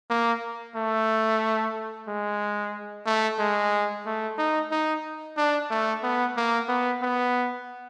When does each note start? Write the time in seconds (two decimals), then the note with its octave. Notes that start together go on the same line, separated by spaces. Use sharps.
0.11 A#3
0.76 A3
2.08 G#3
3.06 A3
3.40 G#3
4.06 A3
4.39 D#4
4.71 D#4
5.37 D4
5.71 A3
6.03 B3
6.37 A#3
6.69 B3
7.02 B3